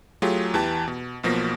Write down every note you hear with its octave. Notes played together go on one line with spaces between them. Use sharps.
F#3 A3 F4 G4 G#4
E2 E3 G4 A5
B2
B1 B2 F3 A#3 A#6 B6